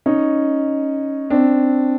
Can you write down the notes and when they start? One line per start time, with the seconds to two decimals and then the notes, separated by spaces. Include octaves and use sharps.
0.06 C#4 D#4
1.30 C4 D4